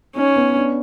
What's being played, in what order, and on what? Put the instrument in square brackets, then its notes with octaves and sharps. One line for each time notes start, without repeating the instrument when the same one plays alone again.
[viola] C#4 [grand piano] D#4
[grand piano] B3
D4